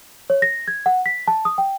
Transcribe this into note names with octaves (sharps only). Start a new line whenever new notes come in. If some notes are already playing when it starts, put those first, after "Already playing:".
C#5
A#6
G#6
F#5
B6
A5
D#6
G5